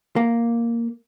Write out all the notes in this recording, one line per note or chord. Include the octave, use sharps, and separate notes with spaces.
A#3